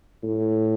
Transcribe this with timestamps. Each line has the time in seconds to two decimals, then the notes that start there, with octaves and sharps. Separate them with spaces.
0.23 A2